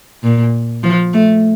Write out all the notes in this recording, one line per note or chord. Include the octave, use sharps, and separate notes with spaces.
A#2
F3
A3